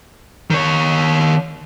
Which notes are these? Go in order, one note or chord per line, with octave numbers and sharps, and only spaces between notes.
D#3 C#5